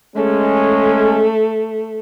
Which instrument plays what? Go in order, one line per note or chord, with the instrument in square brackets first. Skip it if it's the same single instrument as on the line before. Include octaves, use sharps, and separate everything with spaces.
[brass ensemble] G#3 C#4 [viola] A3